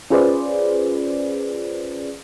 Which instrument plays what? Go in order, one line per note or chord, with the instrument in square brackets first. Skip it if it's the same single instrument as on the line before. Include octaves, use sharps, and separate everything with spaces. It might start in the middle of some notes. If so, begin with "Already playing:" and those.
[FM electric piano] C#4 F4 G#4 B4 C5 D5